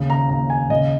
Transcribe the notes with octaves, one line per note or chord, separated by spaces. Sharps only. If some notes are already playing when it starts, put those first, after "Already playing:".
Already playing: D#2 C#3
A#5
D#2 A#5
G#5
C#3 D#5